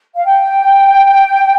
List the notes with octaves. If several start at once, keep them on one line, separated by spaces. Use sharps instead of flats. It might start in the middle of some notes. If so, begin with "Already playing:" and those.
F5
G5